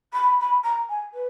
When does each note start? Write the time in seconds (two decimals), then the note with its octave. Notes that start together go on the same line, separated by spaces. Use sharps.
0.13 B5
0.40 B5
0.63 A#5
0.89 G#5
1.14 B4